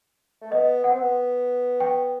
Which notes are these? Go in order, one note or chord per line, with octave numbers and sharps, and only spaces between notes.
A3
B3 D#5
B3 F#5
C4
B3
G5